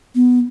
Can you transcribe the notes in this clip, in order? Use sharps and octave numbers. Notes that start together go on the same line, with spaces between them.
B3